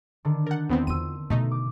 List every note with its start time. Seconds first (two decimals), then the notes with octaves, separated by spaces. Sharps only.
0.25 D3 D#3 D4
0.47 A#4 F#5 G6 A6
0.69 E2 B3 C4
0.87 E2 F4 C6 E6 D#7
1.30 B2 E3 A3 D#4
1.51 D6